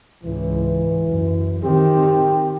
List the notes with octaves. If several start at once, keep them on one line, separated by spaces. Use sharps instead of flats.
C#2 G#2 E3
F#2
D#3 C4 G4